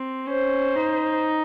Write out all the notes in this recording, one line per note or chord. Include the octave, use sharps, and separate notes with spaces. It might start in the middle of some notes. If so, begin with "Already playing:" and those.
Already playing: C4
C#4 C5
D#4